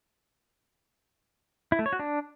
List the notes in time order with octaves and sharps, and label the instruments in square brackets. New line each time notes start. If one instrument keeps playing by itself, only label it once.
[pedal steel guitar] E4
A3
C#5
F#4
D4